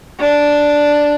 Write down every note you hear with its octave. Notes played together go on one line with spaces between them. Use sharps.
D4